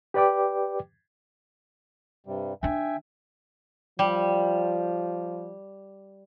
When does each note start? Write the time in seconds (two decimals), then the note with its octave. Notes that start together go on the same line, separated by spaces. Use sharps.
0.14 G4 B4 D5 G5 D6
2.26 G2 C3 G3
2.63 D#3 D4 E5 G5 G#5
3.99 F3 G3